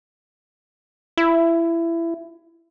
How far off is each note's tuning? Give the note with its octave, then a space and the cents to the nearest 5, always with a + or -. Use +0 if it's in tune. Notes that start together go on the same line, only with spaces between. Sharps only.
E4 +20